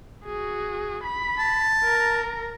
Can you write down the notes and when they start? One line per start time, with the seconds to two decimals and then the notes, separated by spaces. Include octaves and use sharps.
0.25 F#4 G#4
1.03 B5 B6
1.39 A5
1.84 A#4 A#5